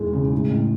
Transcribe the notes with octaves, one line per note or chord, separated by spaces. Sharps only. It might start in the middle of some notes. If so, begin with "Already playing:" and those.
Already playing: E1 E2 G#3
C#3
A2
A1